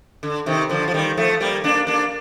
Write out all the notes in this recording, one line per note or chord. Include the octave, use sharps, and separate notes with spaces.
D3
C3 D#3
D3 F3
F3
D#3 G3
F3 A3
G3 A#3
A#3 D4
A#3 D4